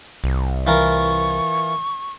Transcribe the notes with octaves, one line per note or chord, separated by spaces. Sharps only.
C2
E3 F4 A#4 C#6